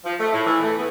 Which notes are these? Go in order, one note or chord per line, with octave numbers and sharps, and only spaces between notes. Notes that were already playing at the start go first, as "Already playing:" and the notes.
F3
A3
A2
E3
A3
B3